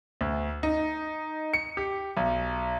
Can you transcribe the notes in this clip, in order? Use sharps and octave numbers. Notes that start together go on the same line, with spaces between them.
D2
D#4
C#7
G4
B1